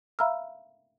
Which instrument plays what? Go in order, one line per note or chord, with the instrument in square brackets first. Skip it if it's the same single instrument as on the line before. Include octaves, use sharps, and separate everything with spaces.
[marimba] E5 F5 A#5 B5 E6 F6